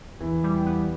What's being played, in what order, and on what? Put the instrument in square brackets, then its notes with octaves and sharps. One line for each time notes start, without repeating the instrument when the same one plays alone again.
[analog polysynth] E2 [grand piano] E3
[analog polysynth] G3
B3